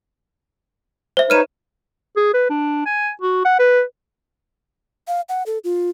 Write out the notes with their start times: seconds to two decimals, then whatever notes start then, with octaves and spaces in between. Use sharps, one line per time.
1.17 C5 E5
1.30 D#4 B4 C#5 F6 D#7 E7
2.17 G#4
2.34 B4
2.50 D4
2.86 G#5
3.22 F#4
3.45 F#5
3.59 B4
5.08 F5
5.29 F#5
5.46 A4
5.64 F4